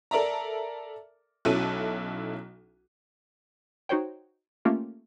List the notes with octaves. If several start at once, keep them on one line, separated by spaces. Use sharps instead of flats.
A4 A#4 D5 E5 A#5
B1 F#3 C#4 E4 A4 D#7
D#4 F#4 C5 C#5 G5
A3 A#3 C#4 F4 G4